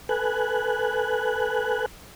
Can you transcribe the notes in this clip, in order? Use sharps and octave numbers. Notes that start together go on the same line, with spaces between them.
A4 B4 G#5 F#6